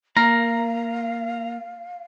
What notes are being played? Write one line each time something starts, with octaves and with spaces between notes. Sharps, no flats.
A#3 A#4 F5 A#5